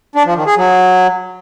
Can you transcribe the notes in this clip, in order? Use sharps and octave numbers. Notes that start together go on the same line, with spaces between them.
D4
F3
D#3
G#4
F#3